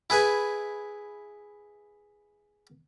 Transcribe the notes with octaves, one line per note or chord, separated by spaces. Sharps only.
E4 G#4 B4 G#5